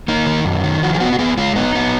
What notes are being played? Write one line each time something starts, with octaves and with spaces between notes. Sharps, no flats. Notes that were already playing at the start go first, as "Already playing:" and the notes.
A#3 D#4
D#3
F#2
D#3
F3 F#4
G#4
B3 F#4
F#4
B3 G#4
G#3 F4
B3 D#4
B3